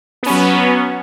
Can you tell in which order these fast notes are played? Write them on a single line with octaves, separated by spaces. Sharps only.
B3 C#4 F#3